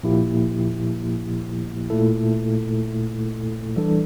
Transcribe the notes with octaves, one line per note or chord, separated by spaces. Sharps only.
A#2 F3 A#3 E4 G4
A#2 A3 E4 A4
E3 G3 D4 A4